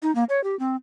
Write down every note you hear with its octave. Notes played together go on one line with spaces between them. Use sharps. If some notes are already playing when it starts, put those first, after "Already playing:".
D#4
A#3
C#5
G4
C4